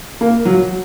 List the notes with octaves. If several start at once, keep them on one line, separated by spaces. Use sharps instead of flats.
A#3
F#3